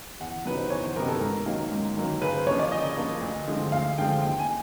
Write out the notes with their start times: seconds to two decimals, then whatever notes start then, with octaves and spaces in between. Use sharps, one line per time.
0.20 E2 F#5
0.45 C3 D#3 F#3 B3 B4
0.57 C5
0.70 E2 C#5
0.84 C5
0.96 C3 D#3 F#3 B3 A#4
1.09 A4
1.21 G#2 A#4
1.46 D#3 F#3 A#3
1.72 G#2
1.97 D#3 F#3 A#3
2.21 C#3 B4
2.34 C5
2.47 F3 A#3 D4 C#5
2.59 D5
2.72 C#3 D#5
2.97 F3 A#3 D4
3.22 D2
3.48 D3 F3 G#3 C4
3.72 D2 F5
3.98 D3 F3 G#3 C4 G5
4.22 D#2 G5
4.39 G#5